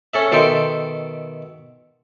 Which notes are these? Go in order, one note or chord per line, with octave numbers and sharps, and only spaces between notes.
C#4 A4 E5
B2 D#3 A4 E5 G5 C6